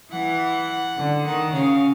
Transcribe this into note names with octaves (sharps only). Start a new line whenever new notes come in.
E3 F#5
D3
D#3 F#5
C#3 F5